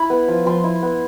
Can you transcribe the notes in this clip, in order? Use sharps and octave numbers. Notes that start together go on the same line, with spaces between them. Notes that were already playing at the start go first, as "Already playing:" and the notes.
Already playing: E4 B5
B3
F3
F3 C6
E4
B3